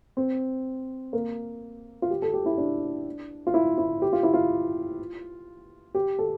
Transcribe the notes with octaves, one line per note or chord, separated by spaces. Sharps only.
C4
A#3
F4
G4
A4
G4
E4
D4
F4
E4
E4
G4
F4
E4
F4
G4
A4